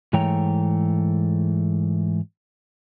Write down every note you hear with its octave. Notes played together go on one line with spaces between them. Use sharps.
G#2 E3 A3 C#5 G5 A#5